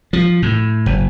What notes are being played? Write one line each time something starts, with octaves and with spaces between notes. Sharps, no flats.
F3
A2
F#1